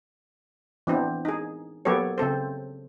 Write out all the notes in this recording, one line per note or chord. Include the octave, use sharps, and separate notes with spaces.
E3 B3 C4 D4
D#4 G#4
F#3 A#3 B3 G4 A4 C#5
C#3 C4 A4 C5